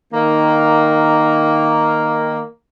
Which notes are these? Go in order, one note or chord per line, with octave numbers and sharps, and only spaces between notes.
D#3 A#3